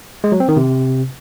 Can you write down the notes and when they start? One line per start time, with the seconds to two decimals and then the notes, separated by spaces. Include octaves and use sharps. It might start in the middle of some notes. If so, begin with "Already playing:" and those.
0.24 G#3
0.32 F#3
0.40 C4
0.48 D#3
0.57 C3